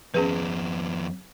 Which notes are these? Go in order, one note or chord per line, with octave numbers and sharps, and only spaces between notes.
F2 B3 C#4 G#4 B4